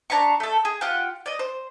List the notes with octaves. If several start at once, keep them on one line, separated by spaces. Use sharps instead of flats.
D4 A#5 B5 C#6
A3 A4
G#4
F4 G4 F#5 G5
D5 D#5
C5